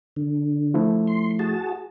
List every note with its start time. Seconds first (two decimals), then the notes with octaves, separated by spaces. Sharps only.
0.16 D3
0.74 F3 A3 E4
1.07 C6
1.39 F#4 G#4 A5